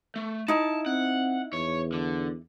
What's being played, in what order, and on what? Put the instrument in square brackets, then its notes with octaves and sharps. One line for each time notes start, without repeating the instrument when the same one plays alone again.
[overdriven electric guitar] A3
[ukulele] D#4 E4 [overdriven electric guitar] A5
[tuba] C4 [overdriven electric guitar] F#5
[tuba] E2 [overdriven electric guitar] C#5
[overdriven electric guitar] D3